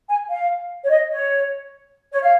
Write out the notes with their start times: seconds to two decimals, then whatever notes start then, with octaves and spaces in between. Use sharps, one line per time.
0.09 G#5
0.29 F5
0.84 C#5
0.90 D#5
1.10 C#5
2.13 C#5
2.23 F5